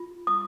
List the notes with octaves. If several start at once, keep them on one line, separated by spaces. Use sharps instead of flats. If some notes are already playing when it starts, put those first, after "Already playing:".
Already playing: F4
D#6